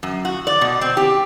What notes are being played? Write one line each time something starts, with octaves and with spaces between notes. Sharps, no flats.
F#2
F#4
D5
B2
C4
G4